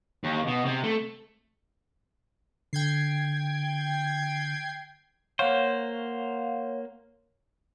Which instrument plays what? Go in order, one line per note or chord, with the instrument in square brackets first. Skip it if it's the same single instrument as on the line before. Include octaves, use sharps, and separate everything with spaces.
[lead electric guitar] D#2
B2
C3
A3
[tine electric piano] D3 [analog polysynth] G5 G#6 C7
[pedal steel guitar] A#3 C5 [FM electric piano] C#5 F5 F#5